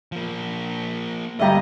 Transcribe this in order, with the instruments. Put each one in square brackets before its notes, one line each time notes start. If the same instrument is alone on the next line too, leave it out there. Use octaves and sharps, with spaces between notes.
[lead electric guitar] F3 A#3
[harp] D2 G2 A#5 [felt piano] G4 E5 [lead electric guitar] D#5